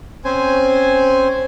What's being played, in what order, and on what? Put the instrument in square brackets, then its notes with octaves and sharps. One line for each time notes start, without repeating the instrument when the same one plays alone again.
[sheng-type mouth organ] C4 C#4 C5 G#5